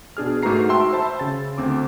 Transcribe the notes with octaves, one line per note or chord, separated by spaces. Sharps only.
B2 D4 G#4 F6
G#2 A3 F#4 B4 A#5 C7
F#4 E5 G5 A5 C6 E6
C5 E5 A5 B5 C6
C#3 A6
D2 C4 D6